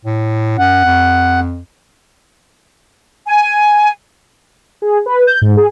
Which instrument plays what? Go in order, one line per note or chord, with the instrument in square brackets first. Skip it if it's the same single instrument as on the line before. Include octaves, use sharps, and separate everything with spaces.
[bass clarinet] A2
[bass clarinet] F#2 [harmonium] F#5
[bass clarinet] F2
[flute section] G#5
[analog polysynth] G#4
B4
G6
G#2
G#4